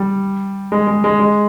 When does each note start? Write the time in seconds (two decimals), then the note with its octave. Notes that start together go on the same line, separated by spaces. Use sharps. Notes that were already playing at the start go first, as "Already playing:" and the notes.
Already playing: G3
0.72 G#3
0.87 G#3
1.04 G#3
1.20 G#3